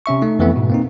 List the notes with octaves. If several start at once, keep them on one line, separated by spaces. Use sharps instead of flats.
C3 C#4 E5 C#6
A3 D#4
F2 E3 A3 B3 C4
G#2 B2
A#3 C4 D#4